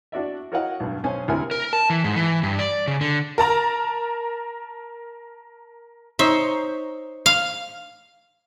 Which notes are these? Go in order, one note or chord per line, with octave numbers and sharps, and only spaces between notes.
D4 F#4 D5 E5
F#4 A#4 C#5 D#5 F5 F#5
B1 G2
B1 C#4 C5 G#5
D2 C3 E4 A#4 G#5
A#4
A5
E3
G#2
E3
G2
D5
C#3
D3
A#4 A5 A#5
D#4 C5 C#5 E5
F5